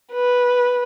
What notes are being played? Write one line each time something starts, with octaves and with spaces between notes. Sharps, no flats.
B4